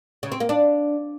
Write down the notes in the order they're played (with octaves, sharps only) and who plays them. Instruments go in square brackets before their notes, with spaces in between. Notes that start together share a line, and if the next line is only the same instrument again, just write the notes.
[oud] C#3
C4
A#3
D4